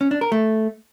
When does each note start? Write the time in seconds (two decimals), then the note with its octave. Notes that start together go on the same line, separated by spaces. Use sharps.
0.01 C#4
0.11 D4
0.21 A#4
0.32 A3